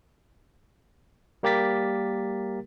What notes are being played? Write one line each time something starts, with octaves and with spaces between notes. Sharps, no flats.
G3 A#3 G4 A#4 A6 B6